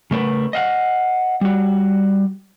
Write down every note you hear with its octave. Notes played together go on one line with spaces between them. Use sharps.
C#3 A3 A#4 B4
D#5 F5 F#5
G3 F#4